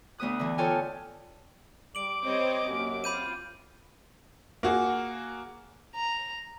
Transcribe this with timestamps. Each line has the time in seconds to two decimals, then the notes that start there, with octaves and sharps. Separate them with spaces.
0.18 D2 B3 B4 D#6 F#6
0.39 D3 E3
0.58 F4 A4 C#5 G5 G#5 F6
1.95 G3 D6 D7 F#7
2.24 G3 C4 C5 C#5 D#5
2.65 F#2 A#3 G4
3.04 C4 F4 B5 G6 D#7
4.63 A#3 F#4 G#4
5.95 A#5